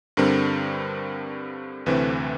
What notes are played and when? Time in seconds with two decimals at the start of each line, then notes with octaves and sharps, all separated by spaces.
0.17 G2 D3 G3 C4 A#4
1.86 D2 C3 E3 A3 C4 B4